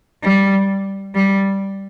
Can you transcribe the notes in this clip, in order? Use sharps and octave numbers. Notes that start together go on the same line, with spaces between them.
G3
G3